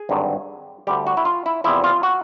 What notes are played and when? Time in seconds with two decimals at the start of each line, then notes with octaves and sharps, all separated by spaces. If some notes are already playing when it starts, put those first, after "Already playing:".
Already playing: G#4
0.09 G#1 G2 D3 F#3
0.87 D2 D3 G3 G4
1.07 F#4
1.17 E4
1.25 F4
1.46 E4
1.64 E2 C3 F3 E4
1.84 F4
2.03 F#4